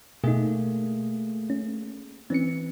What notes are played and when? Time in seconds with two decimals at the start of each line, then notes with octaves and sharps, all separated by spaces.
0.24 B2 A3 A#3 D#4 G#4
1.50 C#4
2.30 E3 C4 C#4 C#7